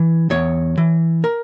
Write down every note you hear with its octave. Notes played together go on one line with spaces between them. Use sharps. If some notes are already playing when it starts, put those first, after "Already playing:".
Already playing: E3
E2 C#5
E3
A#4